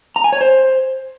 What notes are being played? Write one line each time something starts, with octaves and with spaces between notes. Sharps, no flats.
A#5
G#5
C#5
C5